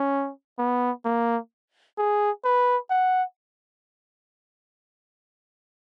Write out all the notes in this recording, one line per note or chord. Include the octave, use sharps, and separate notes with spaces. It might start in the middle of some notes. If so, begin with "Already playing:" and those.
Already playing: C#4
B3
A#3
G#4
B4
F#5